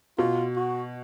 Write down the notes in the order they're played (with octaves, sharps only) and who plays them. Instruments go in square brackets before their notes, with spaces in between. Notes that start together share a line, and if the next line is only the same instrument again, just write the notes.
[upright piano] B2 [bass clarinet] F4
[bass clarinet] F#4